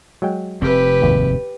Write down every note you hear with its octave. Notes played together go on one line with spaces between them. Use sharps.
F#3 G#3 G5
F1 C4 G4 B4
G#1 D#2